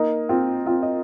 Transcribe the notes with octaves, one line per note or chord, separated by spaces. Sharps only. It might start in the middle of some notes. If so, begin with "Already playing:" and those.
Already playing: A#3 D#4
C4 F4
C4 F4
D#5